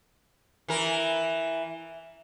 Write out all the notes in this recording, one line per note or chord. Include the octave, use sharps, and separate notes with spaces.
E3 A#4